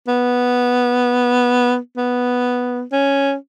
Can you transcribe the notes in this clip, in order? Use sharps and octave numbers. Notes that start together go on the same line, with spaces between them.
B3
B3
C#4